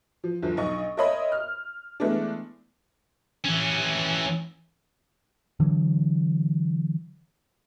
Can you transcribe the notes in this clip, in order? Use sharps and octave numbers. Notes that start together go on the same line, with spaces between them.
F3
G1 F3
B1 D#5 C#6
A#4 C5 C#5 D#5 E5 B5
F6
E3 G#3 A3 B3 D4
E3 C#4
D3 E3 F#3